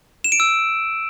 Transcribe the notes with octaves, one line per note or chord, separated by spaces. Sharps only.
E7
D7
E6